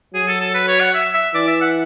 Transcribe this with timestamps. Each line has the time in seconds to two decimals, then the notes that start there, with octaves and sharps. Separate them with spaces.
0.14 F#3 G#4
0.28 A4
0.41 A4
0.54 B4
0.68 C#5
0.80 F#5
0.94 E5
1.14 E5
1.34 E3 D5
1.47 E5
1.61 F#5